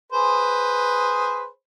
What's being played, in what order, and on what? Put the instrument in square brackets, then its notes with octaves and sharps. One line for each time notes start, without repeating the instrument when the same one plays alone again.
[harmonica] G#4 B4 C5